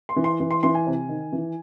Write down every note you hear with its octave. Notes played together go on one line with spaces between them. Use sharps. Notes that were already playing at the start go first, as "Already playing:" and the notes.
C6
E3
C6
E3
C6
E3 C6
G#5
C3
D#3
E3